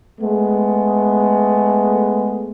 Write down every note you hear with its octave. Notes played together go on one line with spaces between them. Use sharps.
G#3 A3 B3